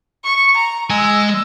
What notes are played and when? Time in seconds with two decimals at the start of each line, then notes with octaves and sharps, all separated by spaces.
0.24 C#6
0.55 A#5
0.90 G#3 G#5 E6